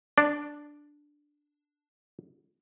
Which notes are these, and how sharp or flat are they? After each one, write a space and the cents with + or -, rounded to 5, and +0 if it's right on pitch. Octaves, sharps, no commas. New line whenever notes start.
D4 +0 D5 +0